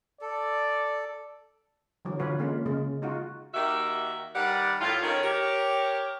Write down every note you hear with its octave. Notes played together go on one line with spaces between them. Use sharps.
A4 D5
D3 E3 F#3
D3 E3 F#3 F4 B4 C#5
G#3 A#3 C#4 F4
C#3 G#3
G#3 D#4 F4 F#4
D#3 A#3 D#4 F#4 G4 E5
D#3 G3 B4 D5 F#5
A2 F4
D#3 C#4 G#4
G4 A#4 C#5